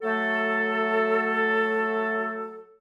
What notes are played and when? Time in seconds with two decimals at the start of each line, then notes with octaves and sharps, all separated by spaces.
0.02 F#3 A3 A4